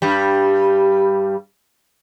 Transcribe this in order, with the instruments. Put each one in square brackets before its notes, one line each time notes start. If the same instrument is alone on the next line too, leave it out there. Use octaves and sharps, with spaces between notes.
[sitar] G2 G3